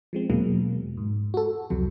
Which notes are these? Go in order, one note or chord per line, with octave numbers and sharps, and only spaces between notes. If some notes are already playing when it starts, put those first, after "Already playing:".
F3 G#3 C4
E2 B2 F#3 G#3 A#3
G#2
F#4 A4
C2 F2 C3 F#3